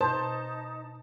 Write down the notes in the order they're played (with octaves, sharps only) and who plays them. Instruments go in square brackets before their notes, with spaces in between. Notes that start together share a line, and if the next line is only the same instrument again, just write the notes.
[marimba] B2 [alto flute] D#4 [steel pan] C5 [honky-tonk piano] A5